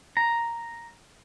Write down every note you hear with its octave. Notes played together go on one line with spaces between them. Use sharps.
A#5